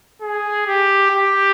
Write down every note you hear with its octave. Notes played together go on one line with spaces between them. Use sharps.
G#4
G4
G4